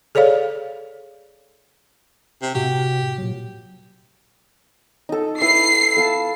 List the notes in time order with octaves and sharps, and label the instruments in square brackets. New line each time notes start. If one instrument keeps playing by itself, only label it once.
[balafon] G#4 A4 C#5 D5 F5
[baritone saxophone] C3
[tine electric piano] A2 C3 F#4 [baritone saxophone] G4
[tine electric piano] A#2 F#3
[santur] D#4 A4
[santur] E4 B4 [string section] C7
[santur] A4 F5 A5